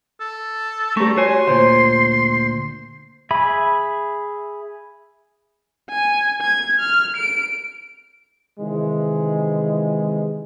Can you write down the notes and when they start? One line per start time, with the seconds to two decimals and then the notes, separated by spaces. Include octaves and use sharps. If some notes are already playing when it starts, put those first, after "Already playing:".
0.20 A4
0.97 G3 A3 G4 A#5 C#6
1.17 F#4 C#5 G#5 C6
1.47 D2 A#2 C5
3.31 G#4 E5 B5
5.90 G#5
6.42 G#6
6.80 F6
7.17 D7
8.59 C3 D#3 E3 G#3